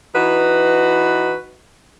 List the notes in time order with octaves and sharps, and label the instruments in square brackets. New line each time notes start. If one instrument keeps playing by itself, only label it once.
[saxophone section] E3 D#4 F#4 B4